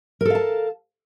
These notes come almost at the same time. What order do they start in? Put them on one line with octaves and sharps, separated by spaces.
A#4 A4 F5 A5